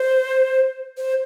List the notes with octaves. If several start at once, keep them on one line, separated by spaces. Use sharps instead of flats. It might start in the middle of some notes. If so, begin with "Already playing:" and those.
Already playing: C5
C5